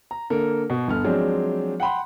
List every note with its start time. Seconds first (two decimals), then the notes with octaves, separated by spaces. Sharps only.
0.11 A#5
0.30 D3 A#3 A4 A#4
0.70 B2
0.88 G1 B3 F6
1.04 F3 F#3 G#3 C4 D4
1.80 F#5 G5 B5 C6